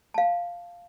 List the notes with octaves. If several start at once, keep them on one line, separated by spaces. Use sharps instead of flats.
F5 A5